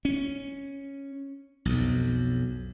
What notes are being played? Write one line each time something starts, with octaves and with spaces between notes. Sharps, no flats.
C#4
B1 F2